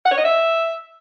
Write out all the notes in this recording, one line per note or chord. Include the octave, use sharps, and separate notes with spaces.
F#5
C#5
D#5
E5